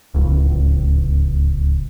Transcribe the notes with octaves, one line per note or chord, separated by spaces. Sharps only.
D1 C#2